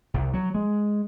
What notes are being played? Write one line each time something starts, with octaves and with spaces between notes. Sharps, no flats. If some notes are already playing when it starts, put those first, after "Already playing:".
C2
F#3
G#3